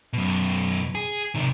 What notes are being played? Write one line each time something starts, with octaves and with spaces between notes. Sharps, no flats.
F#2 B2
G#4
C3 D#3